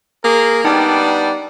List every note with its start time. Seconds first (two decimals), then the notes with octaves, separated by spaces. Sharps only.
0.24 A#3 G#4 A#4
0.65 G3 B3 D4 D#4 G5 A5